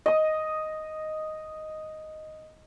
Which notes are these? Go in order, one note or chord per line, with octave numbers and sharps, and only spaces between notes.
D#5 D#6